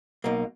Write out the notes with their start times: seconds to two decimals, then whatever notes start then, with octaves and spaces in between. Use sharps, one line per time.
0.24 B1 B2 A#3